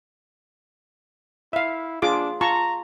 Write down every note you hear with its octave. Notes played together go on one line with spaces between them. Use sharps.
E4 E5 F5
D4 F4 G#4 D6
F4 A5 A#5 C#6